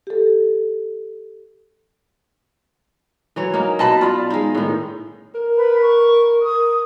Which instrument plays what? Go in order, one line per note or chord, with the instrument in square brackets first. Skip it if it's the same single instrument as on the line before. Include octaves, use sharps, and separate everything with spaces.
[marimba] G4 A4
[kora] E3 F#3 C#5
A#3 C#4 D#4
[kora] B2 [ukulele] D#5 A5 B5
[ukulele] F4 D5 B5
[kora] G#3 D#4
A2 D#3
[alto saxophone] A#4
[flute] B4
C#6
[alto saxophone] A#4 [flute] D#6